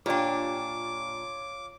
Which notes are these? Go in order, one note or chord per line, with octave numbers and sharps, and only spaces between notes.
A#2 D4 F4 G4 C#5 D5 G5 D6